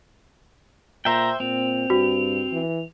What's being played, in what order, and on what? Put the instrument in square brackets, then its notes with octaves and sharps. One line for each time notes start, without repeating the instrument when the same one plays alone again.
[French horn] A#2 [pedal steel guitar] C5 E5 G5 [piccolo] A#5
[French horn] A#2 [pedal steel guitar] C4 [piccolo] F7
[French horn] G2 [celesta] F#4
[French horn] E3